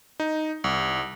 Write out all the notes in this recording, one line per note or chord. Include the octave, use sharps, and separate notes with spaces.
D#4
C2